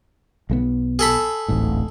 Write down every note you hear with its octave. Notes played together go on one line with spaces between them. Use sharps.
B1 G#3 B3
G#4 A4 B5
D1 A1 G#2